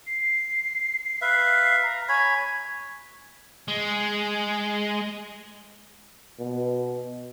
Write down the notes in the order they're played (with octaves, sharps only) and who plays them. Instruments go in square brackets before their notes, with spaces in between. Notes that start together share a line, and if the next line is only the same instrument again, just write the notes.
[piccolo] C7
[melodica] B4 E5 F5
[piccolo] A#5
[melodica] C#5 B5 [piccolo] G#5
[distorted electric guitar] G#3
[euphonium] B2